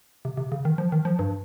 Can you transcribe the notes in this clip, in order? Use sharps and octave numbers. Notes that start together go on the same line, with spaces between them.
C3
C3
C#3
D#3
F3
D#3
F3
G2